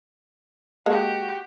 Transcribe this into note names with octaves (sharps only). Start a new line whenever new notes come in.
G#3 A#3 F#4 G4 A4